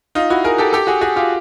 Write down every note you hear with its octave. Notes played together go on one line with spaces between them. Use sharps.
D#4 F4
E4 F#4
G#4 A#4
G4 A4
G4 A4
F#4 G#4
F#4 G#4
F4 G4